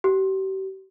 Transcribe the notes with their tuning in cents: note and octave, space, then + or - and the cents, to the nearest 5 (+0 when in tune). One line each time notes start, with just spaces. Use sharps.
G4 -40